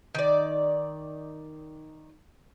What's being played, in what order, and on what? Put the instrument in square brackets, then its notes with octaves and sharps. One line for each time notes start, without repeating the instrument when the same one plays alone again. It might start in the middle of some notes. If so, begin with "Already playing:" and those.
[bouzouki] D#3 D5